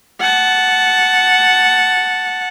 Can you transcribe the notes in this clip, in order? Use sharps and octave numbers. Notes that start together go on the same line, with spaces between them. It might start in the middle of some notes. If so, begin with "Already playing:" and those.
F#5 A5